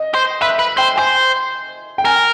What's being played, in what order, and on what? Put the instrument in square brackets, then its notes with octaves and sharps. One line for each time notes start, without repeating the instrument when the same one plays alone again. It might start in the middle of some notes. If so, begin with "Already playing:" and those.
Already playing: [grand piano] D#5
[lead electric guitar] C5
[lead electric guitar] B4 [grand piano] E5
[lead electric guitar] B4
[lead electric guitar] C5 [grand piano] G5
[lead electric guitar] C5 [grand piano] G#5
[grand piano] G5
[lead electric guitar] A#4 [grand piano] G#5